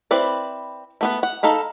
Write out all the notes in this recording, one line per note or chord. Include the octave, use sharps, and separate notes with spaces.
C4 E4 B4 D5
A3 B3 B4
F#5
D#4 A4 F5 B5